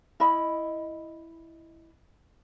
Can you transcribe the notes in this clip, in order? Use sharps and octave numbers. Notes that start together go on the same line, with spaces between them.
E4 D#5 B5